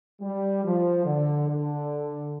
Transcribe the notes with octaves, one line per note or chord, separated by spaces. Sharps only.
G3
F3
D3
D3